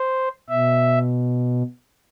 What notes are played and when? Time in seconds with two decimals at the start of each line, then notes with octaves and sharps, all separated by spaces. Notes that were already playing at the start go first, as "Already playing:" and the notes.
Already playing: C5
0.49 B2 E5